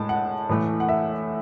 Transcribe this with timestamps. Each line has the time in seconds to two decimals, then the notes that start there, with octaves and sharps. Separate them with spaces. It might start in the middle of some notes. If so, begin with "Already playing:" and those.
Already playing: A2 G#3 A5
0.09 F#5
0.49 A2 E3 A3
0.80 F#5
0.89 E5